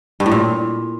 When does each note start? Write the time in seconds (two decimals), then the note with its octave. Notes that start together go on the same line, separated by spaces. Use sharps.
0.20 G2
0.26 A2
0.32 A#2